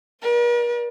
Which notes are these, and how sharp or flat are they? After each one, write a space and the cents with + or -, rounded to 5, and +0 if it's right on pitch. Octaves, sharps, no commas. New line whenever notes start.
A#4 +45 D5 +10